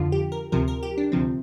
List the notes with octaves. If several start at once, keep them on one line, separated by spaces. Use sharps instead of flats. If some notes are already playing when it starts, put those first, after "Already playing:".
Already playing: F2 D3 F3 F4
G4
A#4
D2 C3 F3 A#4
A#4
G4
D4
D2 C3 F3 C4